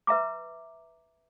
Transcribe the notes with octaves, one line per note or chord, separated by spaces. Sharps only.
B4 E5 A#5 D6